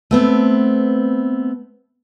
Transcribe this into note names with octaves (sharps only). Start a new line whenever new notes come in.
A3 B3 C4